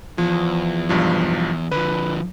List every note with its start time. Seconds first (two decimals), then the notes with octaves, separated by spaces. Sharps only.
0.18 E2 F3
0.89 B1 G2 F3
1.71 D3 F3 B4